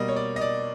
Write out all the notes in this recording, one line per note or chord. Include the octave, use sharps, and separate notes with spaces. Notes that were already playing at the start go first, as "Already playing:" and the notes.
Already playing: B2 G3 A#3 D#5
C#5
D5
D#5
D5